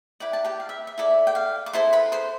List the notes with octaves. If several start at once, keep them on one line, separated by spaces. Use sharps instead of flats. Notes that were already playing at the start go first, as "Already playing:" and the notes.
E4 B4 D5 G5
A5
G4 G5
F5
E5
E5
E4 A4 D5
G5
F5
D6
E4 A4 C5 C6
B4 B5
C5 C6